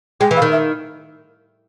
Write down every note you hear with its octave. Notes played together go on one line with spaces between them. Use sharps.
G#3 G5
E3
F5
D#3
E5